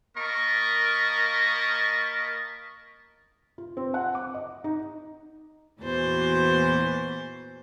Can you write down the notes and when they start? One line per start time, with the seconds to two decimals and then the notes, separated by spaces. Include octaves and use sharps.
0.17 A#3 A#4 D#5 A5 B5 C#6
3.58 F4
3.77 C4
3.94 F#5
4.15 D6
4.34 D#5
4.64 D#4
5.82 E2 A#2 E3 F#4 C5 A6